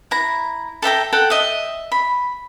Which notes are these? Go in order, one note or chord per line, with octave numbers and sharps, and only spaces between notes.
E4 A#5
A4 E5 G5 A#5
A4 F#5 G5
D#5 E5
B5